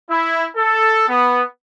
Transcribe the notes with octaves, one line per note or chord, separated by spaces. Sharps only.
E4
A4
B3